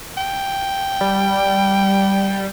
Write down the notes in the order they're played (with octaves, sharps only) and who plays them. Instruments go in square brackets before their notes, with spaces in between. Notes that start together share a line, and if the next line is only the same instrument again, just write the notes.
[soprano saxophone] G5
[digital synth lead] G3